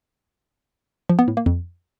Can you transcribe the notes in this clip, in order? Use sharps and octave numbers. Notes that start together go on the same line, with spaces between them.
F3
B3
A2
A#3
F2